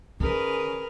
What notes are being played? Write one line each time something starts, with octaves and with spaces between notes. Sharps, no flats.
D#3 C#4 G#4 A#4 B4